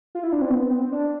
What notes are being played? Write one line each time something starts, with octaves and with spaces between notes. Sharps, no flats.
F4
E4
D4
C4
B3
C4
D4